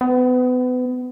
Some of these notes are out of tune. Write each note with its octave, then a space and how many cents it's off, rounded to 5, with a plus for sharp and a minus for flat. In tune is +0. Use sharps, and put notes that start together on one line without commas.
B3 +30